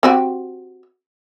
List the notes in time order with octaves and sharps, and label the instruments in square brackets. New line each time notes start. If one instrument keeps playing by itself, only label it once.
[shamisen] C4 F#4 G4